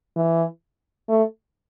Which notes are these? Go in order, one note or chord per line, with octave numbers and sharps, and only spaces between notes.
E3
A3